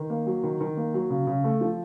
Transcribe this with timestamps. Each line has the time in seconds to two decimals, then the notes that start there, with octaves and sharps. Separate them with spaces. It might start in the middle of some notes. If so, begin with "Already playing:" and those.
Already playing: D#3
0.10 A#3
0.27 F#3
0.44 D#3
0.61 D#3
0.77 A#3
0.94 F#3
1.10 C#3
1.27 C#3
1.44 A3
1.61 F3